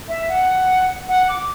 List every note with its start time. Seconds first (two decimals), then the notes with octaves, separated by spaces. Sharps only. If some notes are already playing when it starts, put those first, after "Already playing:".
0.08 E5
0.29 F#5
1.09 F#5
1.29 D6